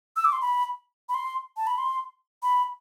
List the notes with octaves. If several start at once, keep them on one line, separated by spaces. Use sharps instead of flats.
E6
D6
C6
B5
B5
C6
A5
B5
C6
B5